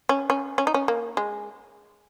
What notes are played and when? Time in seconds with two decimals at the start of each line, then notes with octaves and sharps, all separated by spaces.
0.09 C#4
0.30 C#4
0.58 C#4
0.67 D#4
0.74 C#4
0.88 A#3
1.17 G#3